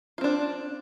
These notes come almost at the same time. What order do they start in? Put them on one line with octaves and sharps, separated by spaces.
F4 C4 D4